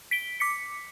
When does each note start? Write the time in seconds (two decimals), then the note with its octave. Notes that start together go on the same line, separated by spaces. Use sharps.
0.11 B6 D7 G7
0.40 D6 B6 C#7